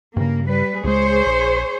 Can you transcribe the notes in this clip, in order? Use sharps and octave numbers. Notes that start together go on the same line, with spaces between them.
G2 C#3 A#3
G3 B4
C#2 G#3 G#4 C5 C#5
A#1